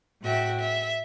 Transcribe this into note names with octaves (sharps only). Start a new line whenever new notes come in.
A2 F#4 E5 G5
E5